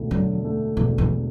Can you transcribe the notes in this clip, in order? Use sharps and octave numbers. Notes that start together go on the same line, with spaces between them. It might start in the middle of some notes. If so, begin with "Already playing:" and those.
Already playing: E1 D2
D3 F#3
A3
E1 E3
E3